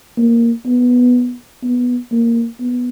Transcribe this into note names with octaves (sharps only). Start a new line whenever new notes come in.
A#3
B3
B3
A#3
B3